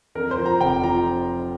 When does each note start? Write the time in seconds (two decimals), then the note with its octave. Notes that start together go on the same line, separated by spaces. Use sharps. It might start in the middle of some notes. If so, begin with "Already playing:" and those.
0.15 F2 A#4
0.31 C5
0.38 F3
0.46 A#5
0.60 F1 G5
0.83 F3 A#5